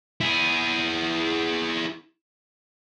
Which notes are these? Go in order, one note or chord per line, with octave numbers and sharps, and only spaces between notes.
E4 G#4